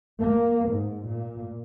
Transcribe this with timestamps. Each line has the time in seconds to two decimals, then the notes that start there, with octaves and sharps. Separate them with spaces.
0.20 A#3
0.70 G#2
1.07 A#2